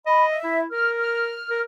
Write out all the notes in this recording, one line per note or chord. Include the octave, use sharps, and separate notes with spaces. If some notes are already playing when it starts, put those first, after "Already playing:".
D#5 B5
E5
E4
A#4 F6
F6
A#4